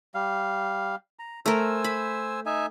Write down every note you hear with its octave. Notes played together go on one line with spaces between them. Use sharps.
G3 F5
A#5
A3 A#4 C5 G#5 E6
B5
D#4 E5 G#5